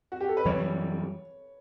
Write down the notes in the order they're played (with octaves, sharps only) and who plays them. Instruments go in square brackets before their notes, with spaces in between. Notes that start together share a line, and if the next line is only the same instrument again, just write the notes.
[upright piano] F#4
G4
A4
B4
[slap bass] F#2 E3 G3 [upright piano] C#5